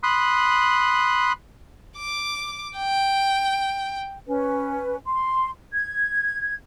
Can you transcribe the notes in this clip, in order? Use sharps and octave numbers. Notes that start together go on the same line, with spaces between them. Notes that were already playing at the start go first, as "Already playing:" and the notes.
B5 C6 D#6 F#6
D6
G5
C#4 B4
C6
G#6